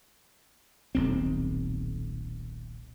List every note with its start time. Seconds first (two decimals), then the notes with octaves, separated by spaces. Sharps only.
0.95 D#1 B1 C4